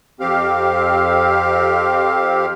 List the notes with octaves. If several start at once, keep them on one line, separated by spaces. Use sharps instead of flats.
F2 C4 G4 F5